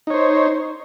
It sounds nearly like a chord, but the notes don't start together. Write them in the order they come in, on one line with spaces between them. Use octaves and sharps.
D#4 C#5 C5